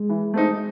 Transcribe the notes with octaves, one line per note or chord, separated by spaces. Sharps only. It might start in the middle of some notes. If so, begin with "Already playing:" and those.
Already playing: G#3
E3
A3 C4 D#4